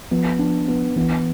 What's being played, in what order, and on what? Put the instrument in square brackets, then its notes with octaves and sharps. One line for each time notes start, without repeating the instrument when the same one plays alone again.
[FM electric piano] F3 [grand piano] B3
[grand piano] D4
B3
[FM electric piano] E3 [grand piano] B3